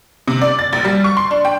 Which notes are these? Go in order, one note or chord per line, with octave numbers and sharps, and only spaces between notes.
C3
D5
A6
A#1
G3
C#6
C6
D4
G5